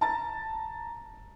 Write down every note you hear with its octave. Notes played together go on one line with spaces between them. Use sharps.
A5 A#5 A6